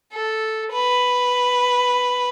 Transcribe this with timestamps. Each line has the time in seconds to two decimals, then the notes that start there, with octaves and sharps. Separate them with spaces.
0.13 A4
0.72 B4